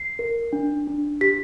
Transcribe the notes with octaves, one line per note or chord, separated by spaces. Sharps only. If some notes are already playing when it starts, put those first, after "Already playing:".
Already playing: C7
A#4
D4
D4
G4 B6